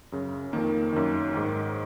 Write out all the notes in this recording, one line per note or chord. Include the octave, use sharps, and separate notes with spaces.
F#2 C#3
F2 D#3 A#3
F#2 D#3
G#2 D#3